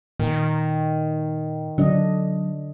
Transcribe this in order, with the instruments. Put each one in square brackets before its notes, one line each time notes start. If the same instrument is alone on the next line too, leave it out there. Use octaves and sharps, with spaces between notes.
[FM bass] A#2 [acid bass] D#3
[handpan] D3 D4 D#5 [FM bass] F#3